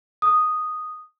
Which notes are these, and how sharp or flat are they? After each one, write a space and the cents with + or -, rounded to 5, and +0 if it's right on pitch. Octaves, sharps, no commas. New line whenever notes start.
D#6 -5